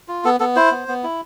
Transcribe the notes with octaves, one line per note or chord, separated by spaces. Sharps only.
F4
B3 A4
B3 A4
E4 C5
B3
B3
E4